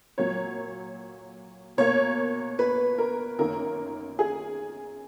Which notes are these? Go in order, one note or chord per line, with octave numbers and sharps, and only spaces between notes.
A#2 F#3 A#3 C#5
B2 A#3 C#5
B4
A#4
F#2 D#3 A#3 A#4
G#4